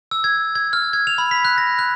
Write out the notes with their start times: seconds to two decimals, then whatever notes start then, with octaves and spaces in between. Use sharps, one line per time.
0.11 E6
0.24 G#6
0.55 G#6
0.73 F6
0.93 G#6
1.07 F7
1.18 B5
1.31 B6
1.45 F#6
1.58 A#6
1.79 F#6